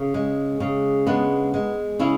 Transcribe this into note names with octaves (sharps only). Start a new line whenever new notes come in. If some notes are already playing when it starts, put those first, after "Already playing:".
Already playing: C#3
G#3
C#3
G#3 B3 D4
G#3
C#3 C#4 E4